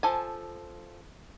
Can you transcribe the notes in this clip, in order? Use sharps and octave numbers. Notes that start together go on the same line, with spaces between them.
F3 A4 G#5